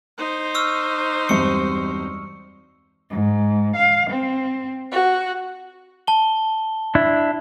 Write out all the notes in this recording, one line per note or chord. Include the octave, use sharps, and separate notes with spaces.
D#4 C5
C#6 E6 F6
E1 G2 C4 C#6 C#7
G#2
F5
C4
F#4
A5 G7
D4 E4